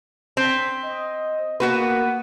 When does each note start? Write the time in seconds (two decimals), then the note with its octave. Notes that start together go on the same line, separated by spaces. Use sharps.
0.37 C4 B6
0.83 D#5
1.60 A#3 B3 F#4 B4